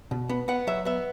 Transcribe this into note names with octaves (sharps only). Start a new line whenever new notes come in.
B2
B3
B3 F#5
F#3 E5
B3 E5